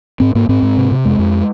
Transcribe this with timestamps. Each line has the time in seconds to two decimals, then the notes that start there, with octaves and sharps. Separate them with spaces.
0.20 G#2 C4
0.35 G#2 A#3
0.49 G#2 C4
0.62 G#2
0.77 C3
0.92 C3
1.05 F2 G#3
1.19 F2